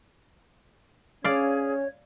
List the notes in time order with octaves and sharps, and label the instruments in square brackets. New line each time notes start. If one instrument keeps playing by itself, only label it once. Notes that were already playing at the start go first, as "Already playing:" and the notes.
[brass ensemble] C#4 [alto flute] G#4 [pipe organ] C#5 [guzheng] D5 F5